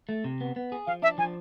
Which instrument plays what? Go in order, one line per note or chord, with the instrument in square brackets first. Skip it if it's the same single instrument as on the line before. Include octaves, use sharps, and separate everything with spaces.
[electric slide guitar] A3
C3
B3
B3
G#4
[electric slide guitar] F3 [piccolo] F5
[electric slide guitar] D4 [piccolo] E5
[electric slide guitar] F3 [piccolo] G#5